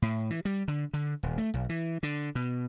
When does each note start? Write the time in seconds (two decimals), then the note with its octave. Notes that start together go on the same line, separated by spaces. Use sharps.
0.02 A2
0.30 E3
0.45 G3
0.68 D3
0.94 D3
1.23 D#1
1.38 A3
1.54 B1
1.69 E3
2.03 D3
2.35 B2